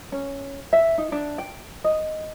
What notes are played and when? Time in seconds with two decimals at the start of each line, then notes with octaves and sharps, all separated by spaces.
0.12 C#4
0.73 E5
0.98 D#4
1.12 D4
1.38 G5
1.84 D#5